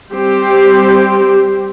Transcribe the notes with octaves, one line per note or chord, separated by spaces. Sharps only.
G3 C4 G4 C5